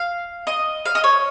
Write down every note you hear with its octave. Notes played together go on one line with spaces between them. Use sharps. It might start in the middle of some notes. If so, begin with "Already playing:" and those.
Already playing: F5
D#5
F5
D#5
C#5